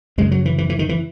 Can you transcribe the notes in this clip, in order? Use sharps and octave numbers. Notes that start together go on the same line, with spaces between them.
F#2 C#3 G#3
F#3
E3
E3
E3
D#3
E3